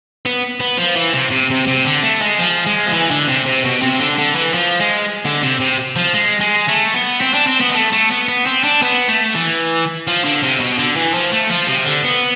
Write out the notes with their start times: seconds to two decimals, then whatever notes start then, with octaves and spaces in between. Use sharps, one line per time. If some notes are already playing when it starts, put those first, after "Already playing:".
0.25 B3
0.60 B3
0.78 F3
0.96 E3
1.13 C3
1.31 C3
1.50 C3
1.68 C3
1.85 D3
2.03 A3
2.21 G#3
2.39 F3
2.66 G#3
2.87 F3
2.93 E3
3.11 D3
3.28 C3
3.46 C3
3.65 B2
3.82 C3
4.00 D3
4.18 D3
4.35 E3
4.54 F3
4.80 G#3
5.25 D3
5.42 C3
5.60 C3
5.96 F3
6.14 G#3
6.40 G#3
6.68 A3
6.94 B3
7.21 C4
7.34 D4
7.47 C4
7.61 B3
7.70 G#3
7.74 A3
7.93 A3
8.10 B3
8.28 B3
8.46 C4
8.64 D4
8.82 B3
9.08 A3
9.36 E3
10.07 F3
10.24 D3
10.43 C3
10.60 B2
10.78 D3
10.96 E3
11.14 F3
11.32 A3
11.50 F3
11.67 C3
11.85 D3
12.03 B3